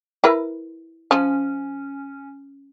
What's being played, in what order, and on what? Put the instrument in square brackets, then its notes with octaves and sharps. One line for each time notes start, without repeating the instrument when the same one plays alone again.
[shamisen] E4 A#4 B4
[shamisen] F3 [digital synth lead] C#4